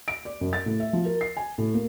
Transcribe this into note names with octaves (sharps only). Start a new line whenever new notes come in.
D7
D5
F#2
A6
A2
E5
F3
A#4
C7
G#5
A2
A#3